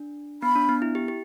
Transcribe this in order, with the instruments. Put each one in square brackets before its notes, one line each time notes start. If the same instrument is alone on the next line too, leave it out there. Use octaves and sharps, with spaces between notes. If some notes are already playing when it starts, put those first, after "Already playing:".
Already playing: [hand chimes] D4
[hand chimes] B3 [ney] B5
[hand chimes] D4
B3
E4
G4
G4